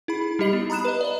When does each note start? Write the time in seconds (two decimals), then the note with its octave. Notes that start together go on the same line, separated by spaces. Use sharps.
0.08 E4 G#4 B5
0.39 G3 D#4 G4 D#5 C7 F#7
0.53 B3
0.70 A#5 B5 D#6 F#6 E7
0.85 B4 D#5
1.01 D5 D#5